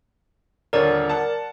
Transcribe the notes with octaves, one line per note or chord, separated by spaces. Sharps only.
D#1 D3 A#4 C#5 D5
F#5 A5